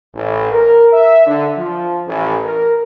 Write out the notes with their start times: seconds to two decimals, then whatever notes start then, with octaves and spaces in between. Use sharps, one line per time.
0.14 A1
0.51 A#4
0.93 E5
1.27 D3
1.57 F3
2.07 A1
2.44 A#4